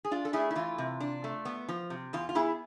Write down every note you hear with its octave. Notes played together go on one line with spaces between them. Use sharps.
G#4
D4 F4
A4
A3 E4 G#4
E4
E3 F4
C3
D4
A3
B3
F3
C3
E2 F4
F4
B3 E4 G#4